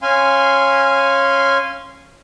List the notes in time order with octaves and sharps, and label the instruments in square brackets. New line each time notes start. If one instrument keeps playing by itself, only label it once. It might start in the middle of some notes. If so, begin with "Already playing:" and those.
[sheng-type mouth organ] C#4 F5 G#5 C6